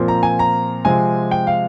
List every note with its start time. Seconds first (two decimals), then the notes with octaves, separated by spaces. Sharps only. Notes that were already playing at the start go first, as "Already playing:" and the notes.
Already playing: A#2 F3 C4
0.08 A#5
0.23 G#5
0.39 A#5
0.85 C3 F3 G#3 C4 G#5
1.31 G5
1.47 F5